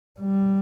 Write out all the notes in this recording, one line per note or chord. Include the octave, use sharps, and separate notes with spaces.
G3